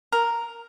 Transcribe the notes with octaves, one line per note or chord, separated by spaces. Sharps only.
A#4